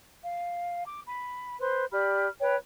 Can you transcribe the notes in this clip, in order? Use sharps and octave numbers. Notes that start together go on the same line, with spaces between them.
F5
D6
B5
B4 C5 C6
G4 D5 B5 F6
B4 C#5 G5